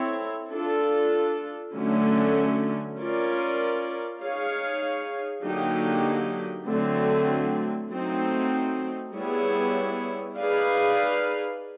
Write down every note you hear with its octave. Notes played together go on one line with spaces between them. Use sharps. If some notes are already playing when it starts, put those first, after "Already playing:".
Already playing: C4 E4 A4 C#5
D4 F4 A4
D3 F#3 A3 C#4
C#4 F4 A#4 D5
D#4 G#4 C#5 F5
D3 F#3 A#3 D#4 G4
D3 F#3 A3 C4
F#3 A3 C4 D#4
G3 B3 E4 G#4 C#5
D#4 G#4 B4 D5 F5